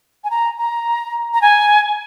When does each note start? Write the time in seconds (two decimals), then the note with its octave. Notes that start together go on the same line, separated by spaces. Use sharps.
0.24 G#5
0.31 A#5
0.58 A#5
1.34 A#5
1.42 G#5